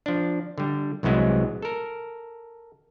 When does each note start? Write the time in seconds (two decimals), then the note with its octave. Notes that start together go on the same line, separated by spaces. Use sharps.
0.06 F3 D4
0.58 D3 G3
1.03 C2 C3 E3 F#3 G#3 B3
1.62 A4 A#4